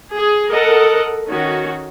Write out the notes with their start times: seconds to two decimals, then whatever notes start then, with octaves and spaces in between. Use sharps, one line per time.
0.14 G#4
0.50 A4 A#4 D#5 F#5
1.27 D#3 C#4 F#4